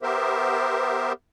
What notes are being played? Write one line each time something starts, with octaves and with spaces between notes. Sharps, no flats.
B3 G4 A#4 C5 E5